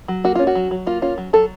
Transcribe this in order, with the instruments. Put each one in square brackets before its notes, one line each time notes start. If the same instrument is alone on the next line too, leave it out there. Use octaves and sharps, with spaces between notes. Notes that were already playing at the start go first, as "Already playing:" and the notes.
[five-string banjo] F#3
A#3 F#4
C#4 F4
F#4
F#3
F#3
A#3 F4
C#4 F4
F#3
F#3 A4